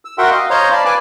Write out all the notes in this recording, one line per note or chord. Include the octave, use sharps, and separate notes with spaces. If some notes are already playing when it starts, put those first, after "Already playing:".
E6
F#4 A#4 E5 F#5 G5 C6
D#5 F5
C5 C#5 D#5 F5 A#5 C6
D5 F5 A5 B5
B4 D5 G#5 D6 F#6